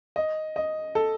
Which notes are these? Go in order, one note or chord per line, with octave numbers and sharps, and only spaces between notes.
D#5
D#5
A4